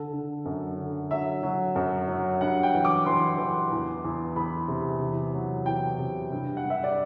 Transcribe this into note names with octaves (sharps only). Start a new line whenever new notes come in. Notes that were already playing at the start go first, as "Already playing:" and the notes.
Already playing: D3 A4
D3
F#2
D3
F#3 E5
F#3
F#2
F#3
G2 F#5
G5
E3
D6
E3 C6
E3
E2
E2
E2 B5
C3
E2
F#3
E2 G5
C3
G2
F#5
G2
E5
D5